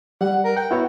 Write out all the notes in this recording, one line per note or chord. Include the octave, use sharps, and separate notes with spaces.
G3 F#5
A#4
F#5 G5
B3 E4 F#4 C#5